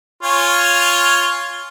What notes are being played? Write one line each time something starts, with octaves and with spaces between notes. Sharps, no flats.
F4 C#5 G#5